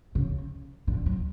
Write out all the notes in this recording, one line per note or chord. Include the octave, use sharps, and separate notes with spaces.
C#3
D3
F#3